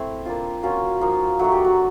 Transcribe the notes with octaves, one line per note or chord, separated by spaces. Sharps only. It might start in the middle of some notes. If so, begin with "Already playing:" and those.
Already playing: A3 C4 E4
A#3 D4 F4
A#3 C#4 F4 F#4
F3 A#3 D#4
F#3 A3 D4 F#4
G4
F#4